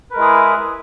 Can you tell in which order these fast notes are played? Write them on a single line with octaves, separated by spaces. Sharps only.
B4 A#4 G#3 E4 G#4